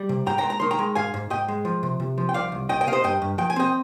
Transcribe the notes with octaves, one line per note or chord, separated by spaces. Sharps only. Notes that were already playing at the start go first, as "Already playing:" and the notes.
Already playing: G3
C3
G#2 G5 A#5
G5 A#5
G#3
A#5
D#3 C6
G5 A#5
G#3
G#2 F5 G#5
G#2
G#2 D#5 G5
G#3
F3
C3
C3
F3
G5
C2 D5 F5
C2
C2 D#5 G5
D#5 G5
C3 F5
C5 D#5
G2 D#5 G5
G2
F3 G5
G#5
C4 D#5 G5